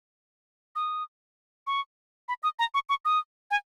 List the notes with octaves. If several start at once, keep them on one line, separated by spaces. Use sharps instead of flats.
D#6
C#6
B5
D#6
A#5
C#6
C#6
D#6
G#5